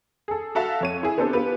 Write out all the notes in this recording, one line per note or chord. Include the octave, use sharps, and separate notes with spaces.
G#4 A4
F#4 A4 E5 F5 A5
F2 C#5 D#7
E4 G#4
B3 C4 D4 G4 A4 C5
B3 F4 G4 B4